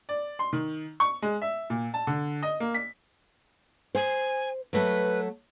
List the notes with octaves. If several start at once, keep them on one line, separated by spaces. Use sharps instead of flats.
D5
C6
D#3
C#6
G#3
E5
A#2
A5
D3
D#5
A#3
B6
C5 G#5
F#3 A3 B4